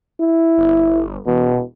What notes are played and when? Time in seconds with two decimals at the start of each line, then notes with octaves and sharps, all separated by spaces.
0.20 E4
0.58 G1
1.26 E1 B2